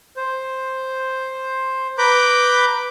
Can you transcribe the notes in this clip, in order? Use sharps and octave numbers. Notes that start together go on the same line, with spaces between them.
C5
B4 A#5 B5 D6 G6